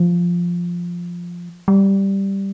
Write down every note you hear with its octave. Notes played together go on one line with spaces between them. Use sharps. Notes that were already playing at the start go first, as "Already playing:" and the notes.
Already playing: F3
G3